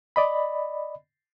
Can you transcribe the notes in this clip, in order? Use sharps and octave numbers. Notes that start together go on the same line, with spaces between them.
D5 D#5 B5